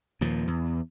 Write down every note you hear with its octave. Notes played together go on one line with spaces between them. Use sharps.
D#2 A#2 F3
E2